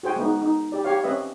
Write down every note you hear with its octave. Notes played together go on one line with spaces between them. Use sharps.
F#4 G#4 C5 G5 G#5
G#3 B3 D#4
D#4
G4 D5
G4 C#5 F5
C4 C#4 B4 D#5 E5